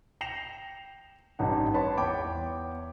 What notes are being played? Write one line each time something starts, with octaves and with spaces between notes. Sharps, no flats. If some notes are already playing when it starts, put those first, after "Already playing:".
G5 A#6 C7 E7 F7
A1 G2 D#4 F#5
B4 C#5 A5 B5 C6
E2 C#5 G5 B5 D6